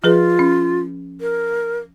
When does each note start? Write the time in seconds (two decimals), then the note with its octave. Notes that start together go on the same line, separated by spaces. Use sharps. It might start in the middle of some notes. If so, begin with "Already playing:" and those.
0.04 F3 F4 G#4 B4
0.39 C#4
1.21 A#4